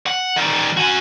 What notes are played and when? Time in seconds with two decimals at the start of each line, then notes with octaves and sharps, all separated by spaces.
0.06 F#5
0.36 D#3 G3
0.77 F#4 G#5